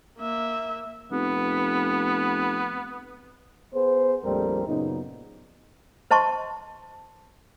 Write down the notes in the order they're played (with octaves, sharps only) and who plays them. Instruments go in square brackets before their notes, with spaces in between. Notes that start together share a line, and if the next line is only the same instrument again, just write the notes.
[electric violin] A#3 E5
[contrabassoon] F1 [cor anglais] B3
[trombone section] B3 G#4 B4 C5
A#1 F2 G3 A3 C4 A#4
F#2 A#2 C#3 B3 D#4
[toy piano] C5 D#5 A5 C6 C#6